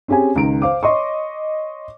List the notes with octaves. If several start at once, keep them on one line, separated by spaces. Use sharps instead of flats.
C4 C#4 G4 G#4 G#5
C#2 D#3 A#5 D7
C5 F5 D6
C#5 D#5 C6 C#6